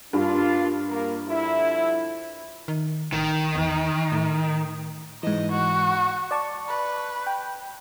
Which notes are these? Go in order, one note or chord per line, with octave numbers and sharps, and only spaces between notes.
G2 A#3 D4 F4
A#3
D3 F3 E4
D#3
A1 D#3
E2
A2
G#2 E3 D#5
F#4
D5 A5 C#6
B4
G5